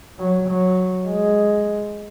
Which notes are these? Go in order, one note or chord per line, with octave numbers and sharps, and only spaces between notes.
F#3
F#3
G#3